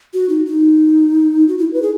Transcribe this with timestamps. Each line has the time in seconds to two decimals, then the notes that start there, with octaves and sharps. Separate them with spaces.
0.14 F#4
0.29 D#4
0.46 D#4
1.48 F#4
1.58 E4
1.73 B4
1.82 G#4